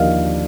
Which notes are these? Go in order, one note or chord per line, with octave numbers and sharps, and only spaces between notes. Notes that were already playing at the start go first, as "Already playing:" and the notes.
Already playing: D#2 D3 F3 D5 D#5 F5